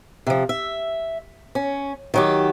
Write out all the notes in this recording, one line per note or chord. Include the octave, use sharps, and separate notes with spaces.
C3 F3
E5
C#4
D#3 F#3 G4